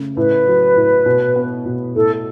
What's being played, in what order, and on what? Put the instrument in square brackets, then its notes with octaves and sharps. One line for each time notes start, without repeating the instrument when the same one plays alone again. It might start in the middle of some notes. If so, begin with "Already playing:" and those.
Already playing: [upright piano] C#3 A3
[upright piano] A2 [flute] B4
[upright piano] F#3
A2
B2
B3
B2
[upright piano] A2 [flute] A4